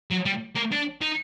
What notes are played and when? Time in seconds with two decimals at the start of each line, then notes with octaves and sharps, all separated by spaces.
0.10 F#3
0.25 G3
0.55 A#3
0.72 D4
1.01 D#4